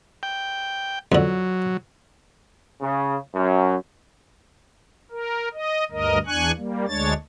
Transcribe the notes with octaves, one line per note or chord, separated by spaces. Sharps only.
G5
F2 D3 F#3
C#3
F#2
A#4
D#5
D2 G2 A#4 D#5
E2 D4 G#5 C#6 F#6
G3 A#3
D2 G#3 D4 C#5 A6